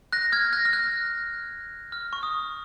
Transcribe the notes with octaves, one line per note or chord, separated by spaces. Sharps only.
F#6 A#6
F6 G#6
F#6 A#6
F6
F#6
F6
C#6
D#6